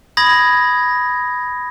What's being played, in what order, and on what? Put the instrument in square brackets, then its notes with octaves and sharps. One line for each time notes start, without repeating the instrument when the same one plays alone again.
[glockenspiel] B5 D#6 G#6 A#6